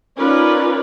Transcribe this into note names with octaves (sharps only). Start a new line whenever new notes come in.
C#4 D#4 F4 A#4 B4 D5